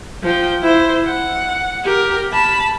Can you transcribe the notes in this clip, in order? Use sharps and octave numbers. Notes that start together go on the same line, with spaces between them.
F3 G5
E4 C5
F#5
G4 A#4
A5 B5